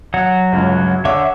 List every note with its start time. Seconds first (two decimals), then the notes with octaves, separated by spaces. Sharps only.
0.14 F#3 F#5
0.52 G1 C#2
1.05 D3 C#5 E5 F#5 D6